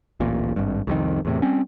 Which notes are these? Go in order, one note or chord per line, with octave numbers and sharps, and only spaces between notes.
D1 A1 A#2
G#1 G2
C2 F2 D#3
E2 A2 C3
G3 C4 C#4